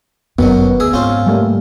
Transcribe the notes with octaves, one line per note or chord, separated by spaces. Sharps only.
G1 F#2 B2 D#3 F#3 B3
D2 G#4 E5
G#2 C4 C#4 F4 F5
G3 A3 A#3